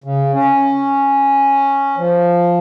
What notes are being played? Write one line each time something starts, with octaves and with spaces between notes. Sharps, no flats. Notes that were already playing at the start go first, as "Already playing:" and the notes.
C#3
C#4
F3